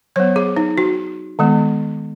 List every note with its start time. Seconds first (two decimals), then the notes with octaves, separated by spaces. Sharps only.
0.16 F#3 B3 C#5
0.36 G#4
0.56 D#4
0.78 F#4
1.39 D#3 G#3 B3